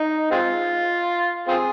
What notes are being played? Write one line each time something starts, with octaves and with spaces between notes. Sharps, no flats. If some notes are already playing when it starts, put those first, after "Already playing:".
Already playing: D#4
G#3 C4 F4
C4 F4 G#4